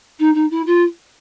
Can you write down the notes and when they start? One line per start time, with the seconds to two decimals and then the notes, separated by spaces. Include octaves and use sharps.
0.19 D#4
0.34 D#4
0.50 E4
0.66 F4